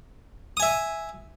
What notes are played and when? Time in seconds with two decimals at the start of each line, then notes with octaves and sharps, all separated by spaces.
0.57 D#6
0.60 G#5
0.62 E5